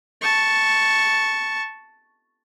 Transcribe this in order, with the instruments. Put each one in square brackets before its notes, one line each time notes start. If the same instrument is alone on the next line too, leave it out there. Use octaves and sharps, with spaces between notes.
[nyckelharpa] A5 C#6